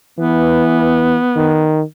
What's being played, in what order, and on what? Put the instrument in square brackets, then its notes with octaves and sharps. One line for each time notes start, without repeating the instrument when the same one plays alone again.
[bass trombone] E3 [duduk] B3
[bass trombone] D#3